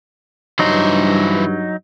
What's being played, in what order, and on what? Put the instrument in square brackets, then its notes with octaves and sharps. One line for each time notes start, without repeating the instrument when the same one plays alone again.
[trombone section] G2 [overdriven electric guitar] E3 C5 [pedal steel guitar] F#3 D#4